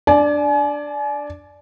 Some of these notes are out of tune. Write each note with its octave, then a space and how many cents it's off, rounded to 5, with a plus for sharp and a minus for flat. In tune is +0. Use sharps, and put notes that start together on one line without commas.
D4 +0 D5 +0 G#5 +40